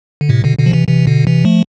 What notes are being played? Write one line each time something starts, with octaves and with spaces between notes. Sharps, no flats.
D3
A2 C3
B2 D3
B2 D3
F3
C3 E3
C3 E3
B2 D3
C3 E3
F3 A3